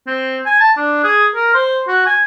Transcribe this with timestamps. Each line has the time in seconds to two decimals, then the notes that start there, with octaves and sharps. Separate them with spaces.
0.07 C4
0.46 G#5
0.60 A5
0.77 D4
1.04 G#4
1.35 A#4
1.54 C5
1.88 F#4
2.06 G#5